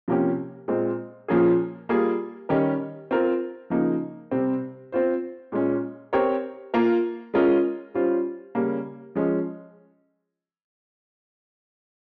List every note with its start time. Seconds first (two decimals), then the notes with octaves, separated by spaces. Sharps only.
0.08 C3 F3 A#3 C#4 G4
0.68 A#2 G#3 C4
1.28 A#2 F3 A#3 C#4 G#4
1.89 G3 A#3 F4 G#4
2.49 D#3 G3 C#4 G4 A#4
3.11 C4 F4 A#4
3.70 C#3 F3 A#3 D#4
4.31 C3 G3 C4
4.92 C4 F4 C5
5.52 A#2 G#3 C#4
6.13 C4 G4 A#4 C#5
6.74 A#3 F4 A#4
7.34 G#3 C#4 F4 A#4 D#5
7.94 G3 C#4 F4 C5
8.55 C#3 G3 A#3 C#4
9.16 F3 G#3 C#4